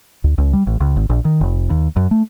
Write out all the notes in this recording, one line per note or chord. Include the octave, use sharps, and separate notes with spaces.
D2
C#2
G3
A1
C#2
G#1
A#1
D#3
F1
D#2
F#2
A3